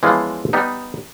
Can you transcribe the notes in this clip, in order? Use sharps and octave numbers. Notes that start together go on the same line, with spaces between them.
E3 F3 G#3 B3 C#4 F4
G3 B3 D#4